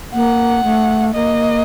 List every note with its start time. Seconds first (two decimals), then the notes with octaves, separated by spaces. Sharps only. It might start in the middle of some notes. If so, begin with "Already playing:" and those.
0.14 A#3 F#5
0.64 A3
1.14 A#3 D#5